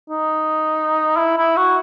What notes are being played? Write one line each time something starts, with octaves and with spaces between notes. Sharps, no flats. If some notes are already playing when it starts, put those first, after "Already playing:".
D#4
E4
E4
F#4